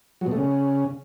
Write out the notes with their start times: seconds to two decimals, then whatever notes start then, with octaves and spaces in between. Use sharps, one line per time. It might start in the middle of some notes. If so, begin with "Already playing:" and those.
0.21 F#3
0.26 B2
0.31 A3
0.36 C#3